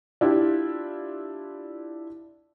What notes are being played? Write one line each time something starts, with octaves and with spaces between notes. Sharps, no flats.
D4 E4 F4 G4